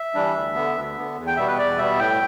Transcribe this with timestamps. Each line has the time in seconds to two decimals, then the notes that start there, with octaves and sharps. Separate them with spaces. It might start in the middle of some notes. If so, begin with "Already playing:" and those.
Already playing: E5
0.15 E3 G3 D4
0.35 D2
0.55 D3 B3
0.76 D2
0.97 D3 B3
1.17 E2
1.27 G5
1.37 B2 G3 B3 E5
1.47 B4
1.58 E2 D5
1.78 B2 G3 B3 E5
1.98 A2 G5